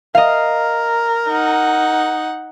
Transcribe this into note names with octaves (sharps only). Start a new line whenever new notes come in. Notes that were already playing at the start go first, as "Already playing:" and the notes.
A#4 D#5 F5
D#4 F#5